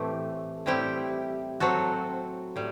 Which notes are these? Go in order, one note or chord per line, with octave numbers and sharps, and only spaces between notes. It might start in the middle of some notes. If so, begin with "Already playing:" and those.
Already playing: A2 E3 A3 C4 G4
A2 G3 C4 E4 G4
F#3 C4 F#4 A4
A2 G3